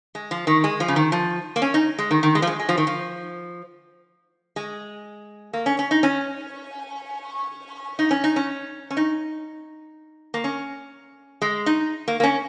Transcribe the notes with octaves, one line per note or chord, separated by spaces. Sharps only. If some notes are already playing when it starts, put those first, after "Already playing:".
G#3
F3
D#3
G#3
F3
C#3
D#3
F3
A#3
C#4
D#4
G#3
D#3
D#3
G#3
F3
G#3
G#3
F3
D#3
F3
G#3
A#3
C#4
C#4
D#4
C#4
D#4
C#4
D#4
C#4
C#4
D#4
A#3
C#4
G#3
D#4
A#3
A#3
C#4